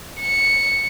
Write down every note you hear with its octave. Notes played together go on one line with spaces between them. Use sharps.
C#7